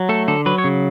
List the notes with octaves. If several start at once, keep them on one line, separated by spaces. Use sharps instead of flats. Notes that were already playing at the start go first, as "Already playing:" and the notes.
Already playing: F#3
A3 A4
D3 A4
F#3 B4
C#5
C#3